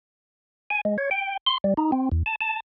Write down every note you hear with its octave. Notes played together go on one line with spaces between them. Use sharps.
G#5
G#3
C#5
G5
C6
G3
D#4
C4
E2
A5
A5